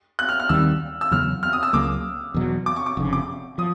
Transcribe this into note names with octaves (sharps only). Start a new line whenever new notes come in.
F#6
F6
F6
D#2 D#3 G3 C4 E6
E6
E2 C#3 F#3 B3 F6
F6
D#6
E6
C#2 C#3 F#3 A#3 D6
E2 B2 F#3
D6
C#6
D6
F1 F2 C#3
D6
F3 D#6